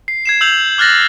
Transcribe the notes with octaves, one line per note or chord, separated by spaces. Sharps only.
C7
G#6 C7 E7
E6 G6 F7 F#7
D6 F6 F#6 A6 A#6